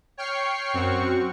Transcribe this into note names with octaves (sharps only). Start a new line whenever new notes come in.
C#5 G5 C#6 F6 C7
F#2 C4 F#4 C#6